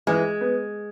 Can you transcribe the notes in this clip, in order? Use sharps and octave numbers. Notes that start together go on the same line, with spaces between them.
E3 G#3
B3